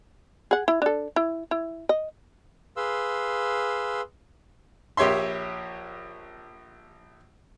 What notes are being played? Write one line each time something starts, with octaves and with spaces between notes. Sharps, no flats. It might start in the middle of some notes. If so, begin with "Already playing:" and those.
G#4 F#5
E4
D4 A4
E4
E4
D#5
G#4 B4 F5 C6 E6
A#1 G4 C#5 E5 C6